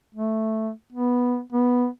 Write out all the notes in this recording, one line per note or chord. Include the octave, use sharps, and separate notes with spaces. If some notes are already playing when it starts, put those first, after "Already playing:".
A3
B3
B3